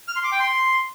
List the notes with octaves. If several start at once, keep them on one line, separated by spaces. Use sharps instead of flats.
F6
C6
D6
G5
C6